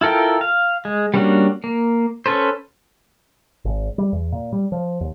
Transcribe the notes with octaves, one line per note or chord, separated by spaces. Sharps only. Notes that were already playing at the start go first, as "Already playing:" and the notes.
E4 F4 A4 A#4 G5
F5
G#3
G3 A#3 C#4 D4 F#4
A#3
C#4 A4 B4 C5
G#1
G3
E2
A#2
G3
F3
D#2